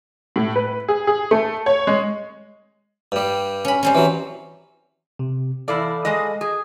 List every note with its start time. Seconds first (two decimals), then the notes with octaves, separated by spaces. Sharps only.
0.36 A2
0.56 B4
0.88 G#4
1.07 G#4
1.31 A3
1.66 C#5
1.87 G#3
3.12 G2 G3
3.65 C#4 B5
3.83 G3 C4 C#4
3.95 E3 F#3
5.19 C3
5.68 E2 E4 A4 D5 F5 B5
6.05 G#3 D#5
6.41 G#4